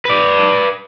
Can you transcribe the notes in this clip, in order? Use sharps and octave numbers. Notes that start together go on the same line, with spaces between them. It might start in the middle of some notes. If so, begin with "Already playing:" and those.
B4 D5